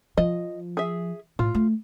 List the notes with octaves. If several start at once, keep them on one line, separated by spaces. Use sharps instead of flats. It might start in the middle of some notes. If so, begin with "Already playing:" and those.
F3 D#5
G#4 E5
A2 F4
A3